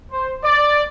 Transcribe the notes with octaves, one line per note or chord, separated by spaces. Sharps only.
C5
D5